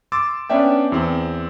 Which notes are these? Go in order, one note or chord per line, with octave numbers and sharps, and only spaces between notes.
C6 D6 E6 A6
B3 C#4 D4 D5 E5 G5
E2 C4